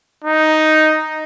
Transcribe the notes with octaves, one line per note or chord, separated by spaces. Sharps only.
D#4